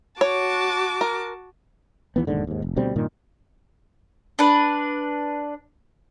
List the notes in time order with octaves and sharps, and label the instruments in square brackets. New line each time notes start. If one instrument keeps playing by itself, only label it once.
[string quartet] F#4 A5 D6 [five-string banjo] C#5
[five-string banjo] A#4
[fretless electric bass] D#2 E3 B3
E1 D#2 G#2 D3
D#2 G#2
F1
D2 B2 G3 C4
G2 A#2 D#3
[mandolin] D4 B4